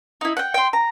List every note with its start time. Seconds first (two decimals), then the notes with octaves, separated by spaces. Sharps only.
0.21 D#4 E4
0.37 F#5 G5
0.54 G5 C6
0.73 A#5